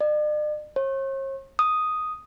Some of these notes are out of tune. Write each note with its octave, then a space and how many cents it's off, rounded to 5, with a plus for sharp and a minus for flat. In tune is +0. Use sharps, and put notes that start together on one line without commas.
D5 +45
C#5 -45
D#6 +0